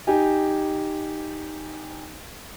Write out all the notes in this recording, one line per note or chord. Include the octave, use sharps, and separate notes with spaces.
D#4 G4 G#5